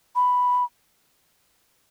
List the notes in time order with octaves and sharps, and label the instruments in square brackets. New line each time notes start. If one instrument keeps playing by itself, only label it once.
[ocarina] B5